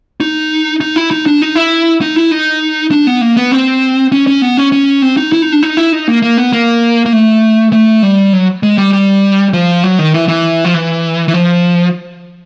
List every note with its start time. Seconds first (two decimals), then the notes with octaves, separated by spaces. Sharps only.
0.20 D#4
0.80 D#4
0.96 E4
1.11 D#4
1.26 D4
1.41 D#4
1.55 E4
2.01 D#4
2.16 E4
2.31 D#4
2.91 D4
3.07 B3
3.21 A#3
3.37 B3
3.51 C4
4.12 C#4
4.27 C#4
4.42 B3
4.57 C#4
4.72 C#4
5.02 C4
5.17 D#4
5.32 E4
5.42 D#4
5.52 D4
5.63 D#4
5.77 E4
5.92 D#4
6.07 A#3
6.22 A#3
6.37 B3
6.53 A#3
7.06 A#3
7.13 A3
7.73 A3
8.03 G3
8.33 F#3
8.63 G#3
8.78 G3
8.93 G3
9.53 F3
9.83 F#3
9.99 D#3
10.14 E3
10.28 E3
10.65 F3
10.74 E3
11.28 E3
11.34 F3